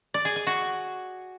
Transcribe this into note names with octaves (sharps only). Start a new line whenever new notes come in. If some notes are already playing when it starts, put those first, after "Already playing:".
D5
G#4
G#5
F#4